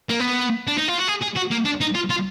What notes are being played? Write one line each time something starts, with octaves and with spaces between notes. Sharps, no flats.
A#3
B3
D4
D#4
F4
F#4
G#4
G#4
F#4
A#3
D4
D#4
F4
F4